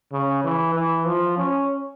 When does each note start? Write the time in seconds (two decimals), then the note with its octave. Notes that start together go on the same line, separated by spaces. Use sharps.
0.12 C#3
0.44 E3
0.75 E3
1.06 F3
1.38 C#4